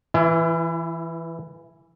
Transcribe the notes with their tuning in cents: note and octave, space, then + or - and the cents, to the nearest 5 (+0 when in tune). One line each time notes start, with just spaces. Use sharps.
E3 +0 E4 +40